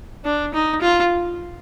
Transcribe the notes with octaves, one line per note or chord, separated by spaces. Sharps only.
D4
D#4
F4